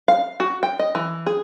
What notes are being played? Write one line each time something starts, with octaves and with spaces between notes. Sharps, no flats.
F5
F#4
G5
D#5
E3
G#4